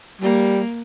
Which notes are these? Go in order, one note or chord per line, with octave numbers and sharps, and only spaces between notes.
G3 A#3